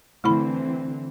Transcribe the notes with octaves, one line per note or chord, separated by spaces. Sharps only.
D3 E3 A3 C4 E4 B5